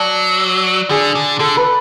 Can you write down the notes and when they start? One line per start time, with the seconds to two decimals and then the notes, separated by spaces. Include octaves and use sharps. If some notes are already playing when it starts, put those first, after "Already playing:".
Already playing: F#3 D5 A5
0.90 D3 G#4
1.15 D3
1.39 D3 A4
1.57 B4